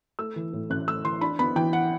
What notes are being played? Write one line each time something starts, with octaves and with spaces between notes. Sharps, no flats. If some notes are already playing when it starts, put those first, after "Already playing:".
A3 E6
E3
A2
A1 F#6
A3 E6
E3 C6
D4 B5
B3 B5
E3 G5
F#5